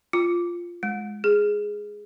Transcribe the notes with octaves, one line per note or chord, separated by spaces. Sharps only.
F4
G#3
G#4